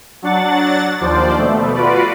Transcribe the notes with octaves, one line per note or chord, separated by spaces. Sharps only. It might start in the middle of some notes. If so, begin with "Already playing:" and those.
F#3 D4 F#5 A6
D#2 F3 C5 D5
B2 A3
F4 F#4 B4 D5